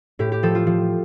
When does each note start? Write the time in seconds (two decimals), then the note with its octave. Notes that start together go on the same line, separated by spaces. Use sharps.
0.19 A2 G4
0.32 G4
0.43 F3 A4
0.55 F4
0.67 F3